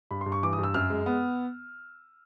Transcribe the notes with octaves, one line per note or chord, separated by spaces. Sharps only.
G2 B5
C6
G2
C#6
E3 D6
D#6
G2 E6
F#2 F6
G#3
B3